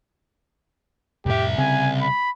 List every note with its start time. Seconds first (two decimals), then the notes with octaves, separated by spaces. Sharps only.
1.26 C2 F2 A2 G4 E5
1.58 C#3 C4 G#5
2.01 B5